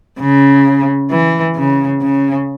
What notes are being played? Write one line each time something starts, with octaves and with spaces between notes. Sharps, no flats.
C#3
E3
C#3
C#3